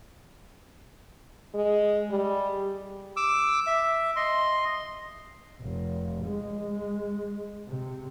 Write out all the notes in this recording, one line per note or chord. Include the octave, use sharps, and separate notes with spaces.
G#3
G3
D6 E6
E5
D#5 C6
F1
G#3
C3